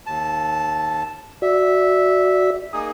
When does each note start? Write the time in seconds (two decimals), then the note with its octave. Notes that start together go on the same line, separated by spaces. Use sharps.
0.06 D#2 A5
1.42 F#4 D5 E5
2.73 A#3 D#4 G#4 D#6